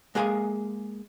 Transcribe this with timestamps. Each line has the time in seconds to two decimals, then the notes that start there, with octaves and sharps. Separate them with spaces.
0.15 G#3 A#3 G#4 F5 G#5